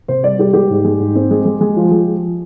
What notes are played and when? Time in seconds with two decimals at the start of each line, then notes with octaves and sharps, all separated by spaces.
0.08 C3 C5
0.23 G3 D5
0.38 G3 G4
0.53 G#3 G4
0.70 G#2
0.85 G#3
1.00 G#2
1.15 C4
1.31 G#3
1.45 G#3
1.61 G#3
1.76 F3
1.91 G#3
2.07 F3